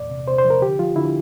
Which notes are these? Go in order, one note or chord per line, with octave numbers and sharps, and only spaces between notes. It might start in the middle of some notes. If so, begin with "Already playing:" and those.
Already playing: E2 A#2 D5
C3
C3 C5
C5
F3
A#4
D3 G4
F3 F4
D3 E4